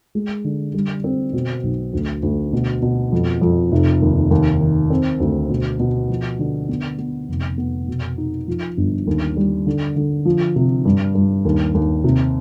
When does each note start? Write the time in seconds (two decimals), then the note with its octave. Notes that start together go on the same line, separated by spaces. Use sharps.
0.15 G#3
0.44 D3
0.74 G3
1.04 C4
1.33 B2
1.63 B1
1.93 D2
2.23 D2
2.53 B2
2.82 B2
3.12 F2
3.41 F2
3.72 F1
4.02 D#2
4.31 D#2
4.61 D#3
4.90 C4
5.20 D2
5.50 B2
5.79 B2
6.10 F3
6.39 D3
6.69 B3
6.98 B3
7.29 F1
7.58 B3
7.88 B2
8.18 D#4
8.48 F3
8.77 G1
9.07 D#2
9.37 G3
9.67 D3
9.96 D3
10.25 F3
10.56 C3
10.85 G2
11.15 G2
11.45 D#2
11.74 D#2
12.04 C3